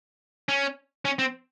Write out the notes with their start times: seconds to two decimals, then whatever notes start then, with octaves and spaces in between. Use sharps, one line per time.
0.49 C#4
1.05 C#4
1.19 C4